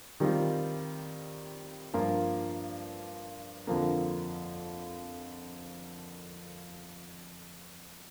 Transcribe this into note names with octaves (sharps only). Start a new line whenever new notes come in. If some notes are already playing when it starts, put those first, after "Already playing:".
D#3 G3 C4 F4
G2 F3 A#3 F4
F2 D3 F3 A#3